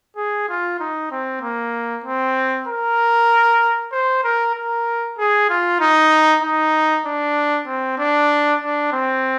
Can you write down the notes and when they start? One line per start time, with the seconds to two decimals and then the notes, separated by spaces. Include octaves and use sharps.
0.16 G#4
0.49 F4
0.80 D#4
1.11 C4
1.42 A#3
2.04 C4
2.68 A#4
3.92 C5
4.24 A#4
4.55 A#4
5.18 G#4
5.49 F4
5.80 D#4
6.42 D#4
7.06 D4
7.67 C4
7.98 D4
8.62 D4
8.93 C4